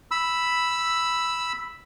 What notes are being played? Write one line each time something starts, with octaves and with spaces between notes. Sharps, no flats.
B5 E6